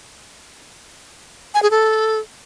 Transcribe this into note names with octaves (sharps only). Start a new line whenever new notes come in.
G#5
G#4
A4